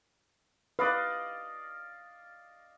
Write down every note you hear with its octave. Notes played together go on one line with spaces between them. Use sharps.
B4 D5 D#5 F5